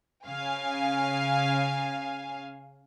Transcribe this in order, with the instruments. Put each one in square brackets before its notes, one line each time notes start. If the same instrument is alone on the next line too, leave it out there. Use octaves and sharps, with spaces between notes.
[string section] C#3 F5 G#5